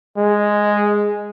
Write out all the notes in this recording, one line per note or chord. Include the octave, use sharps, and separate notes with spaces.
G#3